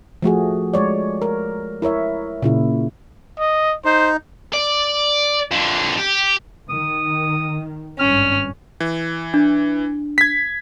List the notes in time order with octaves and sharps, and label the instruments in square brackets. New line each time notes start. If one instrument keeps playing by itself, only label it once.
[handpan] F3 A3 F#4 G#4
G#3 C#5 D5
A#4
E4 A#4 C#5 E5
A#2 C#3 E4
[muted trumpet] D#5
[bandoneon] D#4 [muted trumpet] C5
[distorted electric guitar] D5
F2 D3
G4
[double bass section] D#3 [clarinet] D#6
[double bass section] G#1 G2 [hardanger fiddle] C#4 [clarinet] F6
[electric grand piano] E3
[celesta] D4
[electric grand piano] G#6 B6